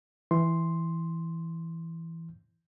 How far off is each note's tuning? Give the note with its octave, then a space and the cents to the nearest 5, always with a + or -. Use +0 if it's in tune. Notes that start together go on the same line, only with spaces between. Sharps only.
E3 +0 C6 +0